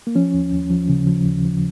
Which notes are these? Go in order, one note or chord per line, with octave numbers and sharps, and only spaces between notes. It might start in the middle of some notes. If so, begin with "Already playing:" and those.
A#3
F3 C#4
D#2
D#2
F3
C#3
F3
D#2
F3